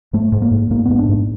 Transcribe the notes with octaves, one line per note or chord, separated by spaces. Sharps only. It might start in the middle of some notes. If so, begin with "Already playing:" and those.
G#2 A3
G#2
A#3
G#2
G#2 A#3
G#2 B3
D4
G#2